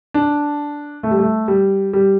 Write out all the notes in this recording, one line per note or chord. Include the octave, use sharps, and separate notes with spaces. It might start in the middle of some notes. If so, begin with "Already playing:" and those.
D4
A3
G3
A3
G3
G3